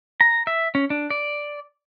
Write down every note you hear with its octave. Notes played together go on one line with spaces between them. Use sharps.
A#5
E5
C#4
D4
D5